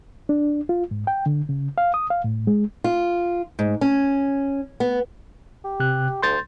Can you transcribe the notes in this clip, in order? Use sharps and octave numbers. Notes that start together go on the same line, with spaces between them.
D4
F4
G#2
G5
D3
C#3
F5
D#6
F5
A2
G#3
F4
G#2
C#4
B3
G4
C3 F#6
D2 C6 G6 A6